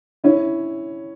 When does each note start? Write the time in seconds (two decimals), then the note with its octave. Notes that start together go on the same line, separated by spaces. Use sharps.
0.24 C#4 E4